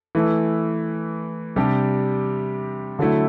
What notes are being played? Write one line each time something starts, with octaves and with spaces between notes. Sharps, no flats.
E3 A3 E4
C3 G3 D4 G4
D3 F#3 A3 E4